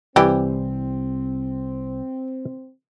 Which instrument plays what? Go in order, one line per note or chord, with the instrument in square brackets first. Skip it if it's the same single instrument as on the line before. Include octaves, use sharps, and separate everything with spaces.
[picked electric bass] C2 [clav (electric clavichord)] E3 [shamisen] G3 G4 [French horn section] C4